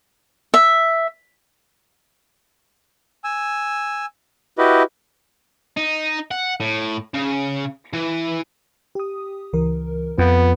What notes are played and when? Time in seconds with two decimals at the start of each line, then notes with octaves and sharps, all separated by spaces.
0.54 E5
3.24 G#5 E6
4.58 E4 F#4 G4 B4 D#5
5.77 D#4
6.31 F#5
6.60 A2
7.14 C#3
7.93 E3
8.95 G4 D#6
9.53 C#2 E3 A#4
10.18 F2 B3 F4